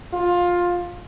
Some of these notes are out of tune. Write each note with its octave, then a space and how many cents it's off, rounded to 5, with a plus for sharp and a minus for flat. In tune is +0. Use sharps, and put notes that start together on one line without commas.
F4 +15